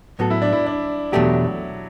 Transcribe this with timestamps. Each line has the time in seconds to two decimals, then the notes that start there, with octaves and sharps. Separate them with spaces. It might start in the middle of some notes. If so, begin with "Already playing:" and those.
0.19 A2 F#3 B3 F#4 A4
0.30 E4
0.42 D4
0.52 E4
0.67 D4
1.12 E2 B2 F#3 A3 D4 G4